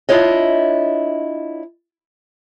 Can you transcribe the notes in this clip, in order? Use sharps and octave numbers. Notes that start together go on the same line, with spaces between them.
D4 E4 F4 C#5 D#5